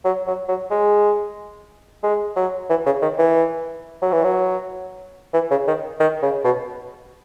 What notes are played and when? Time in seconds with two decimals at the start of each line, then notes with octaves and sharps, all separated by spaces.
0.05 F#3
0.27 F#3
0.48 F#3
0.71 G#3
2.03 G#3
2.36 F#3
2.70 E3
2.86 C#3
3.02 D#3
3.19 E3
4.02 F#3
4.12 E3
4.24 F#3
5.34 E3
5.51 C#3
5.67 D#3
6.00 D#3
6.23 C#3
6.44 B2